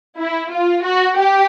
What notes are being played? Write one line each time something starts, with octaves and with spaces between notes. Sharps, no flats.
E4
F4
F#4
G4